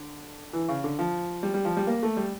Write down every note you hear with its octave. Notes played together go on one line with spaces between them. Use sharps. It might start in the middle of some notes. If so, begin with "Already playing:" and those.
Already playing: D3
E3
C#3
D3
F3
G3
G3
F3
G3
A#3
A3
G3